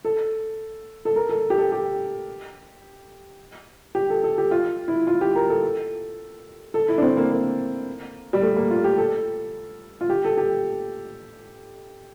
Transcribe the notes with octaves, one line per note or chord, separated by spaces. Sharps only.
A4
A4
A#4
A4
G4
A4
G4
G4
A4
A4
G4
F4
E4
F4
G4
A#4
A4
A4
E4
D4
C4
A#3
A#3
G3
A3
A#3
F4
G4
A4
F4
G4
A4
G4